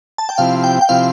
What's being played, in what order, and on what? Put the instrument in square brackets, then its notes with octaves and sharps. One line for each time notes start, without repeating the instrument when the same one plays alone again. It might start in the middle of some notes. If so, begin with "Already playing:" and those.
[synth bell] A5
G5
[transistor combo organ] C3 F3 C4 E4 [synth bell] F5
[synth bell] G5
G5
[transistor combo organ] C3 F3 C4 E4 [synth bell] F5